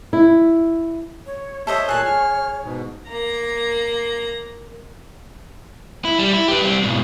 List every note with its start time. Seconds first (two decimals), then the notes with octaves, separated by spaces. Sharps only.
0.13 E4
1.26 C#5
1.67 A4 C5 C#5 D#5 E5
1.89 A#2 G#4 G#5 A5 F#6
2.05 F6
2.63 G#2 B2
3.09 A#3 A#5
6.05 E4
6.19 G3
6.33 E4
6.48 G4 B4
6.61 G3 C4
6.83 G#2 B2